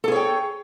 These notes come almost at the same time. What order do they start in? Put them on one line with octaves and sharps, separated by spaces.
A4 G#4 C#5 G5